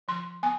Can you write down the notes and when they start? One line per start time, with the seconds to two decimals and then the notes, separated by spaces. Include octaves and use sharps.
0.08 F3 C6
0.43 B3 G#5